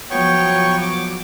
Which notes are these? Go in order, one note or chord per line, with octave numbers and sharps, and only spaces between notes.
F3 F#3 B3 F#4 C#5 G5 C#6
D6